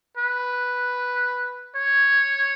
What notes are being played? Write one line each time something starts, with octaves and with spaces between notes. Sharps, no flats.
B4
C#5